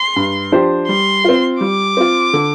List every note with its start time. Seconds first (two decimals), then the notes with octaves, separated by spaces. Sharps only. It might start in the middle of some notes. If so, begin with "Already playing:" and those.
Already playing: C6
0.16 G2
0.52 F3 D4 G4 C5
0.88 G3 C6
1.25 C4 F4
1.61 G3 D6
1.97 C4 F4
2.33 D3